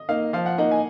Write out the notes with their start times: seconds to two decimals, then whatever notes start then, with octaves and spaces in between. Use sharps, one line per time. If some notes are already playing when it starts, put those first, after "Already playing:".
Already playing: D#5
0.09 A#3 D#4 F5
0.33 F3 F5
0.46 F#5
0.58 A#3 D#4 F#5
0.71 G#5